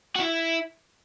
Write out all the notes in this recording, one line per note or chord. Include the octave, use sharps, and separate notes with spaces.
F#4
E4